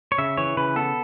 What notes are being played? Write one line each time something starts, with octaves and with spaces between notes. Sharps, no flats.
C#5
C#3 E5
E3 C#5
C#3 B4
B3 A4